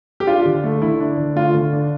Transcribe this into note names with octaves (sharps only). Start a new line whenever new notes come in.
G4
D4 F4
D3
A3
D3 E4
D4
D3
A3 F4
D3
D4